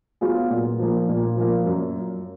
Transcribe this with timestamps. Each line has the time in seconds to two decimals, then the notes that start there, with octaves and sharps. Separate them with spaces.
0.21 F#3 B3 F4 G#4
0.50 A#2
0.79 F3 A#3
1.09 A#2
1.37 F3 A#3
1.66 F#2